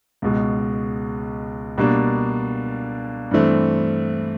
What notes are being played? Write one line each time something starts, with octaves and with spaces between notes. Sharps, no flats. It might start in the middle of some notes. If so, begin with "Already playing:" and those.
C#2 B2 G#3
B2 G3 A#3 D4
G2 E3 A3 C4